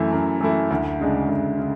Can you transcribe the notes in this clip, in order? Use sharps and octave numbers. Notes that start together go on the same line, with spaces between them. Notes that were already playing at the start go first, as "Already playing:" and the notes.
Already playing: F#2 E3 A3 E4
F#2
E3 A3 E4
D2
C#3 G#3 D4
D2
C#3